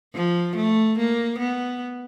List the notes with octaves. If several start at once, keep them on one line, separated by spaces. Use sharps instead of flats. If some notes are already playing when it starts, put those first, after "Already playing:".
F3
A3
A#3
B3